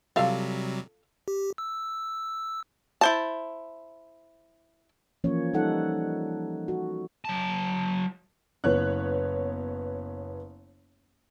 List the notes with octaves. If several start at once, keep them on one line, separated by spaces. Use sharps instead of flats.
C3 F#3 G3 F4 A4 F5
G4
E6
E4 C5 A5
E3 F3 A#3 C#4 C#5
G3 D#4 A4 F#5
F#4
F#3 A5
F#1 B3 C#5 F#6